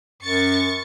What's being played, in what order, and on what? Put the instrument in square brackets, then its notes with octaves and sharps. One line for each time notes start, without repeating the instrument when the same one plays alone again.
[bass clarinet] F#2 [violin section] C#6 A6 C#7